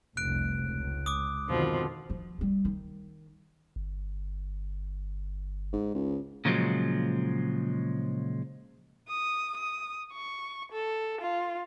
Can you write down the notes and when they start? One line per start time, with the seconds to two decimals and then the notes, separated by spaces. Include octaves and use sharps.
0.17 F1 C2 F#6 D7
0.65 C#2
1.06 D6 D#6
1.48 F2 B2 D3 D#3 F3
2.10 F3
2.38 G3 A3
2.65 D#3
3.76 G1
5.73 G#2
5.94 C#2
6.45 A#2 C#3 F3 F#3 G#3
9.08 D#6
9.57 D#6
10.13 C#6
10.72 A4
11.21 F4